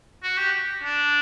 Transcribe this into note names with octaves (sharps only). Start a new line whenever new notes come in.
F#4
G4
D4